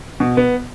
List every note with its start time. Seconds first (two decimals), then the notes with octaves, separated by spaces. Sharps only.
0.20 B2
0.37 B3